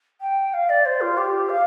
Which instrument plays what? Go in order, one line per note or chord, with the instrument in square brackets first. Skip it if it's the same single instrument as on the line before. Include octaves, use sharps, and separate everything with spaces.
[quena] G5
F5
D5
C5
F4
G4
F5